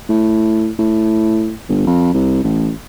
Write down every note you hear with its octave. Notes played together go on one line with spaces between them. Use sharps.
A2
A2
G1
F2
C2
A1